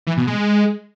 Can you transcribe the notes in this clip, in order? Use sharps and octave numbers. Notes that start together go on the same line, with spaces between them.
E3
B2
G#3